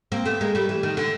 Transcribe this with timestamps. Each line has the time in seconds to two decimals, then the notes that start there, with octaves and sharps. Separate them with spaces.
0.12 A#3 C4
0.26 A3 B3
0.41 G#3 A#3
0.55 G3 A3
0.69 E3
0.83 D#3
0.97 D3